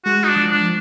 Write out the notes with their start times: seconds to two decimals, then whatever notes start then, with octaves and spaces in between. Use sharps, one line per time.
0.05 G#3 F#4
0.24 D#4
0.28 D4
0.36 F3
0.51 D4